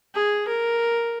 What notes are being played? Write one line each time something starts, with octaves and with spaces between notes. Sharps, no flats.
G#4
A#4